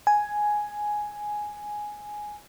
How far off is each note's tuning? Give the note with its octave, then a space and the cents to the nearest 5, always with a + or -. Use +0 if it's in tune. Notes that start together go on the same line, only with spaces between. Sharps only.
G#5 +5